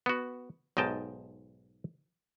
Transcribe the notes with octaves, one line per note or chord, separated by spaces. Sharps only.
B3 F#4
B1 G#2 D#5 G5 A5